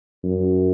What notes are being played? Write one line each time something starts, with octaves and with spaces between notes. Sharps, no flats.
F#2